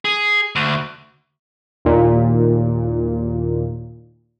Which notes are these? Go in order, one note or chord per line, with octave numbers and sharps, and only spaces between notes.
G#4
D2
D#2 A#2